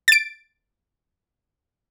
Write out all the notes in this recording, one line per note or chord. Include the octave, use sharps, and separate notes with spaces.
A6 D7